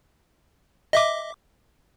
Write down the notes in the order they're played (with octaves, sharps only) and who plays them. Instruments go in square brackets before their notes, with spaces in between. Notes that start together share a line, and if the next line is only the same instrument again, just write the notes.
[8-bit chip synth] D#5 E5 D6